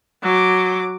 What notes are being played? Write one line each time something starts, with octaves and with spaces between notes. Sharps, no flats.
F#3 D6